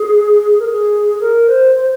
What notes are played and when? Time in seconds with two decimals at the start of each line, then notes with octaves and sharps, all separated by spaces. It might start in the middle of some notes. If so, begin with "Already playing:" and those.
Already playing: G#4
0.59 A#4
0.65 G#4
1.20 A#4
1.48 C5
1.75 C5